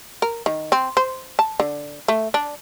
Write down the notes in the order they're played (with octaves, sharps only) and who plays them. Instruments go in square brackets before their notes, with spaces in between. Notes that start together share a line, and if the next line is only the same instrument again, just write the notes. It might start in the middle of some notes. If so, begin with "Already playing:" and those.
[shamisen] A#4
D#3
C4
C5
A5
D3
A3
D4